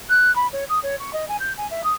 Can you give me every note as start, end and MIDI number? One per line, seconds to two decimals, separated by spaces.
0.10 0.34 90
0.36 0.47 83
0.53 0.65 73
0.69 0.79 87
0.83 0.96 73
1.00 1.11 85
1.13 1.28 75
1.28 1.37 80
1.40 1.53 91
1.57 1.69 80
1.71 1.82 76
1.84 1.93 87